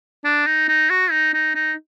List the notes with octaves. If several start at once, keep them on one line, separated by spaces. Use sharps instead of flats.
D4
D#4
D#4
F#4
D#4
D#4
D#4